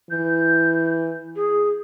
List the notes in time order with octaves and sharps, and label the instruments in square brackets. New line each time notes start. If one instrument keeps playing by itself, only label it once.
[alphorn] E3 [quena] G6
[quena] G#4